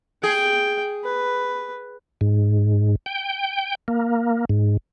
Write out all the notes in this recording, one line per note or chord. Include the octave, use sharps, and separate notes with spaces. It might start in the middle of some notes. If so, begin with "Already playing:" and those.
G#4 G5
B4
G#2
G5
A#3
G#2